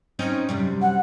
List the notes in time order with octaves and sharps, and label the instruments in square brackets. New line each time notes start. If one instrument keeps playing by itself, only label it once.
[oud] C4 C#4 D#4
F#2 C3 G3
[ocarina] F#5